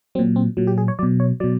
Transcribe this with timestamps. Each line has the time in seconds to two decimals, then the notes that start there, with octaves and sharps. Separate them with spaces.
0.15 F#3 C4
0.19 A#2
0.36 C4
0.57 A#2 F#3
0.67 G4
0.78 G#4
0.88 C#5
0.99 B2 F#3 D5
1.20 C#5
1.40 B2 F#3 D5